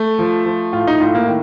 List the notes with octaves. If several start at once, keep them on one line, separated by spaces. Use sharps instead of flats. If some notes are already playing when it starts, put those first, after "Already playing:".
Already playing: A3
F3
F3
A2 F4
D#4
A2 F4
A#3
D#3